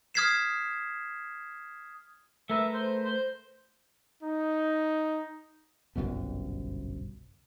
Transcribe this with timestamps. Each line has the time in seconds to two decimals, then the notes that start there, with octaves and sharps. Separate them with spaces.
0.14 D#6 F6 G#6 B6 C7 E7
2.50 A3 A#4 B4 E5
2.74 C5
3.04 C5
4.23 D#4
5.96 G1 C2 F#2 B2